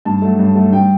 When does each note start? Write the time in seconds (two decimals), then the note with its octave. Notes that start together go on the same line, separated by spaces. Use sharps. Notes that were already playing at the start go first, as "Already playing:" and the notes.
0.05 G2 A5
0.22 F#3 A3
0.39 G2
0.55 F#3 A3
0.73 G2 G5